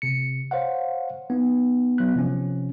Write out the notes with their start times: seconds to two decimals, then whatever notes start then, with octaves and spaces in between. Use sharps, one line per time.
0.02 C3 C#7
0.51 C5 C#5 F5 F#5
1.30 B3 D#4
1.98 F#3 B3 F#6
2.15 C3 F3 C#4